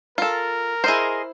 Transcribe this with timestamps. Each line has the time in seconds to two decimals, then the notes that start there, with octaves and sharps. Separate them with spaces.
0.18 F4 A4 A#4
0.84 E4 G#4 C5 D#5 C6